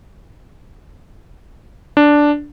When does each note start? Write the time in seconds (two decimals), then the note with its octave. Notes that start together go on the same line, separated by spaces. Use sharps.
1.97 D4